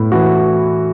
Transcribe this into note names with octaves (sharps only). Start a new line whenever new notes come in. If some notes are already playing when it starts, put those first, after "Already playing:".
Already playing: A2 B3 E4
E3 F#4